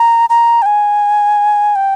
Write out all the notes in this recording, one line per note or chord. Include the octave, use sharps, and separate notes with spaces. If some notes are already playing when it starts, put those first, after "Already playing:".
Already playing: A#5
A#5
G5
G#5
G5